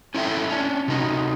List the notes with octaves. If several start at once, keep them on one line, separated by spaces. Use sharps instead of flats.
C#4 E4 A4 E5 G5
C#4 D4
C3 D#4 F#4